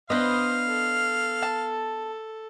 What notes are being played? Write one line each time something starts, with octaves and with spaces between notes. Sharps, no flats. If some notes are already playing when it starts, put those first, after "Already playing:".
B3 D4 B4 C5 D#5 F5 D#6
A4
A5